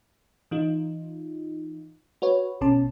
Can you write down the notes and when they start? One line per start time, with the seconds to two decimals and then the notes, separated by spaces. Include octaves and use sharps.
0.51 E3 D#4 F4
2.22 F#4 B4 C#5
2.61 A#1 B2 C#4 A5